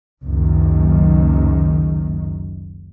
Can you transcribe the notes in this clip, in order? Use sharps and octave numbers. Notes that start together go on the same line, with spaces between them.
F#1 C#2 F#2 D#3